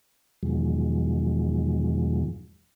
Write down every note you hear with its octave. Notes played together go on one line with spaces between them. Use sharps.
E2 B2 D#3 F3 F#3 G#3